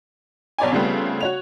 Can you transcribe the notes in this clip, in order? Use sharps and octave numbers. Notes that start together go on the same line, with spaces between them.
B1 C#5 D5 G#5
C#3 F3 G3 A3 B3 C4
F#4 C#5 F7